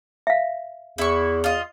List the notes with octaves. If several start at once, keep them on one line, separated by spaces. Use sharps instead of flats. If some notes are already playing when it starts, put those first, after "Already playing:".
E5 F5
E2 E4 C#6
F4 D#5